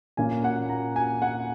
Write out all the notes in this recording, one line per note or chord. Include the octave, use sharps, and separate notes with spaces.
A#2 A#3 C#4 G#5
F#5
A#5
G#5
F#5